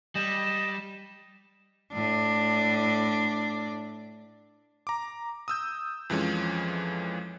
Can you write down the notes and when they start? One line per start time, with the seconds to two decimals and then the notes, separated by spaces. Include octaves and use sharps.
0.15 G3 D#5 E7
1.93 A2 D4
4.87 A#5 D6
5.48 D#6 E6 G6
6.10 F2 E3 F3 G#3 C#4